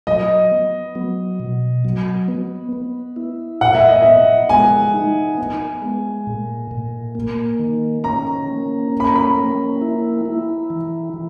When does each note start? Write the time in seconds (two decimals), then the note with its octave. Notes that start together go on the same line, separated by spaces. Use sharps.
0.07 F#3 D#5
0.51 B3
0.95 F#3
1.40 B2
1.85 F#3
2.28 B3
2.73 B3
3.16 E4
3.61 A#2 F#5
3.75 E5
3.88 D#5
4.02 B3 E5
4.49 G#3 G#5
4.94 D#4
5.38 B3
5.82 G#3
6.27 A#2
6.71 A#2
7.15 A#3
7.59 D#3
8.04 C#4 A#5
8.48 A#3
8.92 C#4
9.00 B5
9.08 A#5
9.15 B5
9.37 A#3
9.81 E4
10.26 E4
10.70 E3
11.14 E3